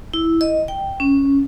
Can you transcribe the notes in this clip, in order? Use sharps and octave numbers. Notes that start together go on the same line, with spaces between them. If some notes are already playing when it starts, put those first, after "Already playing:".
E4
D#5
G5
C#4